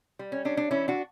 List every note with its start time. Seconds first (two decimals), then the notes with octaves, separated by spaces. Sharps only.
0.19 G3
0.32 C#4
0.45 C#4 D4
0.57 D4
0.71 E3 C#4 E4
0.88 D4 F#4